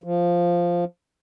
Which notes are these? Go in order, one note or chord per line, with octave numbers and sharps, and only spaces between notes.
F3